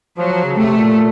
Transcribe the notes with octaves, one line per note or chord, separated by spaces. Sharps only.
F3 F#3
F3
C#3
C3 A3
A#2